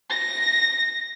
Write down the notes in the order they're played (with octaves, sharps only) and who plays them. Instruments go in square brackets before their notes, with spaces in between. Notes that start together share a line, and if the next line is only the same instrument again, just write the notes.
[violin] A#6